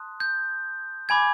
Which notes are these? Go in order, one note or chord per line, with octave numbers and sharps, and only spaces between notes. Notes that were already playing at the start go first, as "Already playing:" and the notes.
Already playing: A5 C6 D#6 F#6
G6
G#5 B5 D6 G#6